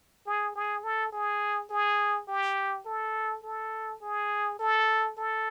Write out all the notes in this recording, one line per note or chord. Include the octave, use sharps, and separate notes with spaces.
G#4
G#4
A4
G#4
G#4
G4
A4
A4
G#4
A4
A4